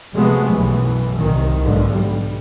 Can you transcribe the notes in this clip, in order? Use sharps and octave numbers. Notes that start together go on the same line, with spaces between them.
C3 F3 F#3 G#3 A3 B3
B1 F#2 B2 E3
C2 D#3
B1 G#2 D3 F3
G3